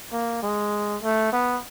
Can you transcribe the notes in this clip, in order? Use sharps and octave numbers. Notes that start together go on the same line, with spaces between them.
A#3
G#3
A3
B3